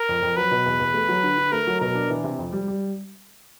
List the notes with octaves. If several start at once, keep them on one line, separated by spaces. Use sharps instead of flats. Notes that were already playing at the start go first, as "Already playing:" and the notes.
Already playing: A#4
F2
F2
F#3 B4
B2
E2
E2
A3
F#3
D3
D3
A3 A#4
F#3
B2 A#4
D4
E3
C3
F2
G3
G3